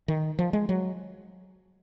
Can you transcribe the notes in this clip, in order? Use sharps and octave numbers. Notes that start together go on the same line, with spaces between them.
D#3
F3
G#3
F#3